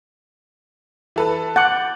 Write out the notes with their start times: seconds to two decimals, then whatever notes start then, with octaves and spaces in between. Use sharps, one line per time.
1.16 E3 A4 B4
1.56 F#5 D6 G6 A6